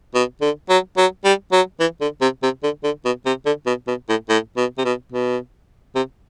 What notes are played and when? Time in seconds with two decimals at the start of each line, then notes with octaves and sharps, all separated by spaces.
0.15 B2
0.41 D3
0.69 F#3
0.97 F#3
1.25 G3
1.52 F#3
1.80 E3
2.01 D3
2.21 C3
2.43 C3
2.63 D3
2.84 D3
3.05 B2
3.26 C3
3.46 D3
3.66 B2
3.88 B2
4.09 A2
4.29 A2
4.57 B2
4.78 C3
4.85 B2
5.12 B2
5.95 C3